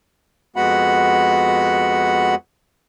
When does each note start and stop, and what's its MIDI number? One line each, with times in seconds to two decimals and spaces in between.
0.56 2.35 41
0.56 2.35 56
0.56 2.35 59
0.56 2.35 66
0.56 2.35 78
0.56 2.35 83